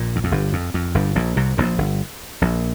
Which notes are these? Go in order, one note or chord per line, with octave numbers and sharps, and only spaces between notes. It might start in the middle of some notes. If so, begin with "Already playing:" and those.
Already playing: A#1 A#2
E2
F2
G1 G2
F2
F2
G1 G2
A#1 A#2
C2 C3
A#1 A#2
G1 G2
A#1 A#2